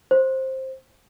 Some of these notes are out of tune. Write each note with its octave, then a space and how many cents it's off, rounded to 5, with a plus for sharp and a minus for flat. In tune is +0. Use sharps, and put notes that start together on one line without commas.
C5 +10